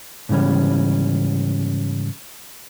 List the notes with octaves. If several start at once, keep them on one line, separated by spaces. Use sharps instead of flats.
G#2 C#3 E3 G3 C#4